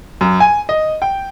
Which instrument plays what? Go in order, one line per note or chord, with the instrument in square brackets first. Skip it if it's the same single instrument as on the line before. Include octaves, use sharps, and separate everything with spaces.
[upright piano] F#2
G#5
D#5
G5